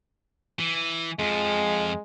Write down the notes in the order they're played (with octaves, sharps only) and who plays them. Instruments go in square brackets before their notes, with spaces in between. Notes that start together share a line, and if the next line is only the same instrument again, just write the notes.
[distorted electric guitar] E3
[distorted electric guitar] F2 F3 [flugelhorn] G#3